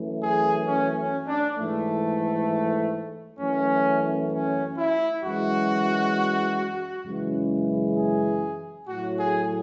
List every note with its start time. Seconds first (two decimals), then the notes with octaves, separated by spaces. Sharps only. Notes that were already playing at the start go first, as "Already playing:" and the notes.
Already playing: F#2 E3 A3
0.20 G#4
0.66 C#4
0.96 C#4
1.27 D4
1.57 G#2 E3 A3
3.40 F#2 E3 A3 C#4
4.31 C#4
4.77 E4
5.23 F#2 E3 G#3 F#4
7.05 F#2 C#3 E3 G#3
7.97 G#4
8.88 A2 F#3 A3 F#4
9.18 G#4